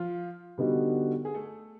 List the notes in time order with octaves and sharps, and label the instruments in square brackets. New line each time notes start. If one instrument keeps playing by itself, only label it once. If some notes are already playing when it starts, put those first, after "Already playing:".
Already playing: [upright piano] F3 F4
[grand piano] D3 G3 B3 D#4 F#4
[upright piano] G#4
A3 A4